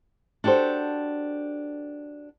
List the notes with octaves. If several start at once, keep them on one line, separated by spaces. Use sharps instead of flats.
D4 F#4 G4 A4 C5